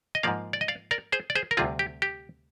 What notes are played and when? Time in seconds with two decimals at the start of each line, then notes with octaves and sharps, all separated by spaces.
0.15 D#5
0.23 G#2 F3 A#3 D5 F5
0.53 D5
0.61 D#5
0.68 D5 F5
0.91 A#4 D5
1.12 G#4 C5
1.30 D5
1.35 G#4 C5
1.51 A#4
1.57 D2 C3 G3 C4 F4 G#4
1.79 G4
2.02 G4